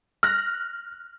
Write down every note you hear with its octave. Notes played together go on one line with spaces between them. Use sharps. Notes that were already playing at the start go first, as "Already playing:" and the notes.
F6 F#6 A#6